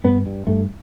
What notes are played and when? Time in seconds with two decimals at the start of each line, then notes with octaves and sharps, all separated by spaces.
0.04 G2 B3
0.26 G2
0.47 G2 A3